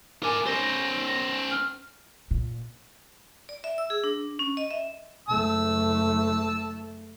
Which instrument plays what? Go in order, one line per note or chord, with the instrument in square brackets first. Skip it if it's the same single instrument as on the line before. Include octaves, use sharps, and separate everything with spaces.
[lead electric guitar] A#4 G#5 [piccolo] D6
[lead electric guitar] C#4 C5 [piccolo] A#6
[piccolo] F6
[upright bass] A#2
[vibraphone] D5
E5
E6
G#4
D4
C#4
D#5
E5
[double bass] F#1 A3 [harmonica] A5 E6